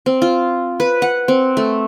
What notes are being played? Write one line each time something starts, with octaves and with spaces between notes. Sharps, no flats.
C4
F4
B4
F#5
C4
A3